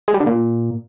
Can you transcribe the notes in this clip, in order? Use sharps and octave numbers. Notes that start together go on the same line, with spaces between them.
G#3
G3
D3
A#2